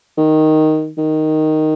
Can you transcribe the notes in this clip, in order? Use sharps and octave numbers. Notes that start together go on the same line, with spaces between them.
D#3
D#3